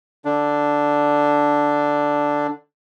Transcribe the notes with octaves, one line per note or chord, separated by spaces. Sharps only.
D3 D4